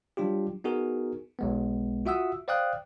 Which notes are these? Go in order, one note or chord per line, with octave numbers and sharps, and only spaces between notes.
F#3 G3 D4 F4 G4
B3 D#4 F#4 G#4 A#4
B1 G#3 B3
F4 F#4 E5 F#5 D#6 E6
C5 D5 F5 G5 D#6 F#6